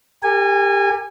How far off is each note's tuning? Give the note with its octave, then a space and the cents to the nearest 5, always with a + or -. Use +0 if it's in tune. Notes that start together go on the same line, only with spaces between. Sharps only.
G4 +20 A#4 -45 G#5 -20